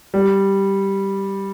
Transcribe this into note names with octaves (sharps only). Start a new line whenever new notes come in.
G3